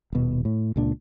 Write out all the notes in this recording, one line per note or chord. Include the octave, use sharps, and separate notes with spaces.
D#1 B2
A2
C#2 A#2 D4